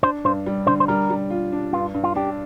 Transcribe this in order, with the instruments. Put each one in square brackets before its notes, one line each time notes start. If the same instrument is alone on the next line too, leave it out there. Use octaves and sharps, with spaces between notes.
[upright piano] D4 [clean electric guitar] C5
[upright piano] G2 [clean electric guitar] C5
[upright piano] G3
[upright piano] D3 [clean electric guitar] C5
[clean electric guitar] C5
[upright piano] G3 [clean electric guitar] A#4
[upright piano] G3
F4
D4
[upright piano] G2 [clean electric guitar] F4
[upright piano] G2
[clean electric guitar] F4
[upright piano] D4 [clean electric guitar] G4